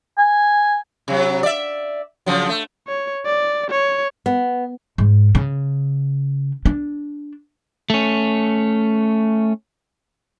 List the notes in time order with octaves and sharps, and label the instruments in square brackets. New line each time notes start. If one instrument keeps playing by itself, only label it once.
[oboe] G#5
[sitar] C3 F#3
D5 E5
C#3 F3 F#3
A3
[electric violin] C#5
D5
C#5
[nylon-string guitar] B3
[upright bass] G#2
C#3
D4
[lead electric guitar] A3 C#4